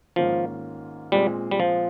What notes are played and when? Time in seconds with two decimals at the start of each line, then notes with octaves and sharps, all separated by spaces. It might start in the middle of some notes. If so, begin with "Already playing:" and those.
0.16 G#2 D#3 F3 A#3 C#4 F4
1.12 A#2 G3 G#3 C4
1.51 G3
1.60 F3